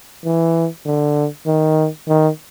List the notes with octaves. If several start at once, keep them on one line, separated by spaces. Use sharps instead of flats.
E3
D3
D#3
D#3